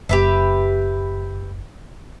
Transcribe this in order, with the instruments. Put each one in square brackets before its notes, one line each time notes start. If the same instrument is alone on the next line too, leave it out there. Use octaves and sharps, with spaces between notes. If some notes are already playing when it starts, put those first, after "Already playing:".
[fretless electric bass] F#1 [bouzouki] G4 B4 E5